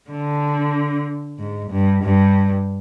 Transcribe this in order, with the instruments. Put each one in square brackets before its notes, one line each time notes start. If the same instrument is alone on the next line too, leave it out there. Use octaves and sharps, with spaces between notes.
[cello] D3
G#2
G2
G2